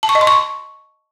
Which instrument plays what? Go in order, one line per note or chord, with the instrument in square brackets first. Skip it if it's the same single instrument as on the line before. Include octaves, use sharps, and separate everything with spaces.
[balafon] A5
C#6
D#5
C6
C#6